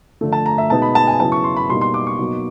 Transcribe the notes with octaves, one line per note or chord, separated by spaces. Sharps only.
D3 F3 A3
A5
A#5
E5
B2 G#3 B3 D#4 A5
B5
A5
G#5
C#3 F#3 B3 E4 A5
C#6
C6
B5
B2 G3 A#3 D#4 C6
C6
D6
C#6
B2 F#3 A#3 D#4